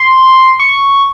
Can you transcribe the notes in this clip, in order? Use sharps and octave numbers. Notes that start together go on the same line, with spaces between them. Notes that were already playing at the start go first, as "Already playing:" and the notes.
Already playing: C6
C#6